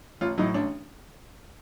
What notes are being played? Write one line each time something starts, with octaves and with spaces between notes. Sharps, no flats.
A1 F4
A2 F#3 D#4
A1 D4